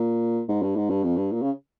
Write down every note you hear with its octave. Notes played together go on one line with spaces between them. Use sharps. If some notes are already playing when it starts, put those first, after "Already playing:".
Already playing: A#2
G#2
G2
G#2
G2
F2
G2
A#2
C#3